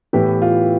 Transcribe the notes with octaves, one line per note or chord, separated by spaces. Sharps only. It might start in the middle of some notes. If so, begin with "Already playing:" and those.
A2 E3 B3 G4
F4